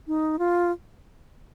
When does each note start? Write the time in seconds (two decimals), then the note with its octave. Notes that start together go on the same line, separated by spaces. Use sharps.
0.07 D#4
0.39 F4